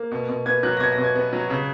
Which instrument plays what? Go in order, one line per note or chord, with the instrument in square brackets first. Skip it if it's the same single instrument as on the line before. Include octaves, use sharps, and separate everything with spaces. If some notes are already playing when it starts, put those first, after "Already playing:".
Already playing: [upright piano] A#3
B2
B2
B3 G#6
F#3 F#6
A#6
B2 G#6
A#6
B2
G#6
B3
F#3
C#3